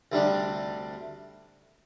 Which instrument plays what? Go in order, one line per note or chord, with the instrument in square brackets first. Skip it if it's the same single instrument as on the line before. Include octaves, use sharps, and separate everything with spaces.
[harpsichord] D2 C3 G3 D4